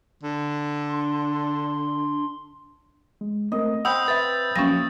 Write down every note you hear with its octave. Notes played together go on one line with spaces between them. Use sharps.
D3
D4 C6
G#3
A3 C4 A#4 D#5
C4 F#5 B5 D#6 E6 G6
B4 E5 A6
F3 F#3 A#3 C4 C#4 F5 A#6